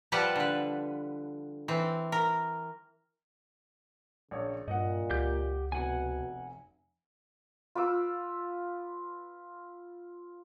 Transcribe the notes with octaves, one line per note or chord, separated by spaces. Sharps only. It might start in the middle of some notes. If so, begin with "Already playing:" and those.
F3 G3 G4 B4 F#5 A5
D3 B4
E3 C4
A#4
A#1 C#3 C#5
G2 A#2 D#5 F#5
C#2 G4 G6
F1 B2 F#5 G#5
F4 B4 D6 E6